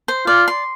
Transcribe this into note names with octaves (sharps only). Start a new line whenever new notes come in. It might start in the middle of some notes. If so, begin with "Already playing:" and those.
C5
F4 D5
C6